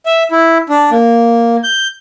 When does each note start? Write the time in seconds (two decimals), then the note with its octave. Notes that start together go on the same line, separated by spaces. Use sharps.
0.06 E5
0.31 E4
0.69 D4
0.91 A#3
1.64 G6